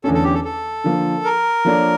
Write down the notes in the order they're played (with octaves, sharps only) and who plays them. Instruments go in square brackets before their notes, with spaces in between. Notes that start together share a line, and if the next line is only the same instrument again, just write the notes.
[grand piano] E2 D3 A3 C#4 [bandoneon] A4
[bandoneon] A4
G4
A4
A4
[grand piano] D3 F3 A#3
[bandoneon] A#4
[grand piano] F3 A#3 D4 A4 C#5